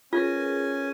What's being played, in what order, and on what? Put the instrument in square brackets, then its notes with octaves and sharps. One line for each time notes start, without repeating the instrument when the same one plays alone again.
[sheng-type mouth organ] C#4 G#5 [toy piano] F4 [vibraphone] G#4 A#4 B4